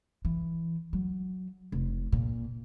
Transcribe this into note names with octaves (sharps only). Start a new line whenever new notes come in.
E3
F#3
F1
A#2